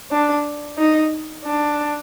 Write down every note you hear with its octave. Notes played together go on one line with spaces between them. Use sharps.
D4
D#4
D4